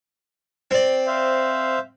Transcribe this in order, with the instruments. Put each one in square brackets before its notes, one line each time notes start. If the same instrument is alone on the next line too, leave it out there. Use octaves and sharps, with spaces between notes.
[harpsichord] C4 D5
[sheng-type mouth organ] C5 E5 F5